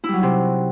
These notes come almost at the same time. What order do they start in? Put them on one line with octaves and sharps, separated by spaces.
E4 G3 F#3 D#4 C3